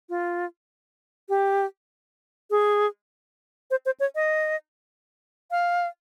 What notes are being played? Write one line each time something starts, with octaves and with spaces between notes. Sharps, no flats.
F4
G4
G#4
C5
C5
C#5
D#5
F5